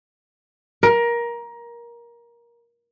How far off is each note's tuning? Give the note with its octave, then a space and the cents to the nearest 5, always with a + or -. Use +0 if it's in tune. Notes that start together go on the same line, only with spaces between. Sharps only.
A#4 +20